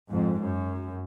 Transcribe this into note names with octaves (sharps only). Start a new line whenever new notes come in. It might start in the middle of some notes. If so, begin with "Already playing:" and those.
F2 G#2
F#2